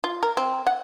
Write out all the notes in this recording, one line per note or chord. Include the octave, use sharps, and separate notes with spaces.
F4
A#4
C4
F#5